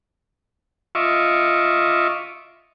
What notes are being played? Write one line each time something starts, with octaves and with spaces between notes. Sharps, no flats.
F4 D#5 E5 C#6 D6